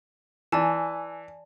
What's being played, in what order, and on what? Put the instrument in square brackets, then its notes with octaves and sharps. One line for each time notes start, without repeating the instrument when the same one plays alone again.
[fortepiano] E3 [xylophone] D5 G#5 A5